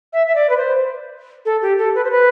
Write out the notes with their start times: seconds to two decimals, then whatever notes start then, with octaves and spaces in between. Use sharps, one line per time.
0.13 E5
0.27 E5
0.35 D5
0.50 B4
0.57 C5
1.45 A4
1.62 G4
1.78 A4
1.95 B4
2.04 C5
2.11 B4